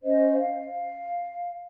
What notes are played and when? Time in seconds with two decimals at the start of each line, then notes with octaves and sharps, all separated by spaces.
0.03 C#4 C5 D#5
0.39 F5